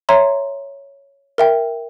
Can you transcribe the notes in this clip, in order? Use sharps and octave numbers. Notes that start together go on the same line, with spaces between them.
C#5 E5 A#5 C6
A#4 E5 G5